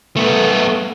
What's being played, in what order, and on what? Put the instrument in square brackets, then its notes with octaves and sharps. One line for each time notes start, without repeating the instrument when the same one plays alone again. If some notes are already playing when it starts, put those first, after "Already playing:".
[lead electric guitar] A3 B3